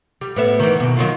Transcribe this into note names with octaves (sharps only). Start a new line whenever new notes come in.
G3
A2 B3 E5
D#3 E3
G2 B2
D#3 F#3 F4